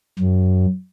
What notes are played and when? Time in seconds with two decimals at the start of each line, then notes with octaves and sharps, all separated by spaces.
0.19 F#2